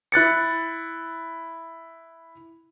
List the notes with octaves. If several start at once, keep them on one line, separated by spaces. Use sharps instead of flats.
E4 F#6 A6 C#7